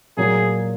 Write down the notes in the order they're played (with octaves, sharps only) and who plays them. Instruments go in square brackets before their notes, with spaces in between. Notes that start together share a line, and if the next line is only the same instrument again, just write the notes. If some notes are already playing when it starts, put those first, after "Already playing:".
[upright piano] A#2 F#3 A#3 [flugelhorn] G#4